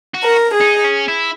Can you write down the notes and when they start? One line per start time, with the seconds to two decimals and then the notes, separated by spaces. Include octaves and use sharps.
0.14 F#4
0.22 A#4
0.53 G#4
0.61 D#4
0.84 C#4
1.08 E4